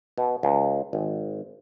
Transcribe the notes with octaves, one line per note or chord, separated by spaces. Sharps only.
B2
C#2
G#1